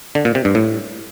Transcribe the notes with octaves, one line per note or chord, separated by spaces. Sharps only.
D3
A#2
C3
G2
A2